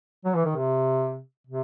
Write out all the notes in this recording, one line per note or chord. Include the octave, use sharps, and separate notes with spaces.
F#3
E3
D#3
C3
C3